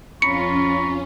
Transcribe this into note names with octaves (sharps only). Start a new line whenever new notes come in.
F2 C#4 F4 A#5 B5 C#6 C#7